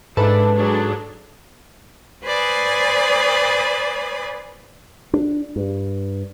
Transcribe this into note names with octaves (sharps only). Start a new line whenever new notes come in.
G#2 D4 E4 A4 B4
F#3 D4 G#4
B4 C5 D5 G#5 D#6
D4
G2